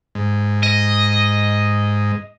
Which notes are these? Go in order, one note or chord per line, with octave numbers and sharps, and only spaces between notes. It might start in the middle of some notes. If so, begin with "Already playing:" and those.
G#2
D#5